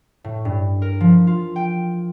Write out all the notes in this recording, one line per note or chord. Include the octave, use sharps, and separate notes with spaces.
A2
G2
A#4
F3
F4
G5